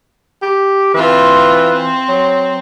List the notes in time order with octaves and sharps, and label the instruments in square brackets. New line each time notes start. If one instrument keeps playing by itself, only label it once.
[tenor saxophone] G4
[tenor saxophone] E3 [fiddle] C4 F4
[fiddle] C4
[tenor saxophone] F#3